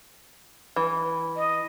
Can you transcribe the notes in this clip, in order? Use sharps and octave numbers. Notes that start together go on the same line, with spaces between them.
E3
D#5